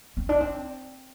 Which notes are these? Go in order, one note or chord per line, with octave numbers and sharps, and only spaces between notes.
C4
D4
C4